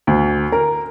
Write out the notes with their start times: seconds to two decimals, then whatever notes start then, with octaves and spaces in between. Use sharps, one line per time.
0.07 D2
0.52 A#4